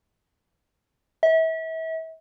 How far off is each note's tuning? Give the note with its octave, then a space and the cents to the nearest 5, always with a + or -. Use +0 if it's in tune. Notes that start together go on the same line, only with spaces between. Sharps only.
E5 -35